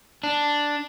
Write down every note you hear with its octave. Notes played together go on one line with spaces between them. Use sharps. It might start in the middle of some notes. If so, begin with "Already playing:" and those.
D4